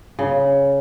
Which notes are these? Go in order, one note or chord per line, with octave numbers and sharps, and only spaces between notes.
C#3